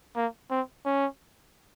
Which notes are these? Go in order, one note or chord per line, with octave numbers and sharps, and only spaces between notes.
A#3
C4
C#4